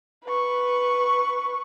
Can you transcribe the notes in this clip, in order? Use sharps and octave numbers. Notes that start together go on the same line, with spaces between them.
B4 C#6